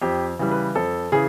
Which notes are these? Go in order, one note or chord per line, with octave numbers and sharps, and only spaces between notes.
F2 G4
C#3 E3 G3
B4
F2 A4
C#3 E3 G#4